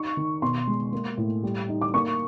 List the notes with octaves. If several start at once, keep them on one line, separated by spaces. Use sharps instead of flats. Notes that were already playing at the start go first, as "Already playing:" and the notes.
Already playing: D#4 C#6
D#3
B2 C6
G#3
A#3
A2
G3
D#4
D6
A#3 C#6